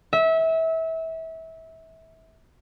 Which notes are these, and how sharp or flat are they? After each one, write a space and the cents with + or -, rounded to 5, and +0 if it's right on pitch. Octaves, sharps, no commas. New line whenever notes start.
E5 -25